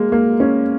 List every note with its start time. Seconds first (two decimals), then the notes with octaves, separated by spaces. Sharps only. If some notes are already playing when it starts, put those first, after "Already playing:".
Already playing: G#3 A#3
0.12 A#3
0.40 C#4